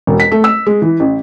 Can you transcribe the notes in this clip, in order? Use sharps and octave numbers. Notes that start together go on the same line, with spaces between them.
E1
B6
A3
E6
G#3
E3
A1